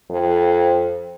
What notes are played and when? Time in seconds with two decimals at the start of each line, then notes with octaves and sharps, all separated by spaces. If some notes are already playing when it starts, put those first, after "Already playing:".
0.11 F2